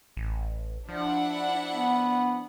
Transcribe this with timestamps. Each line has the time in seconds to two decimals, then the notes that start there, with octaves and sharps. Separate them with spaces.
0.17 A1
0.89 F3 D4 E4 F#5
1.72 B3